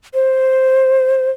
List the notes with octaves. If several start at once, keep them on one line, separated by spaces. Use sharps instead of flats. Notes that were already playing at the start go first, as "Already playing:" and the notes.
C5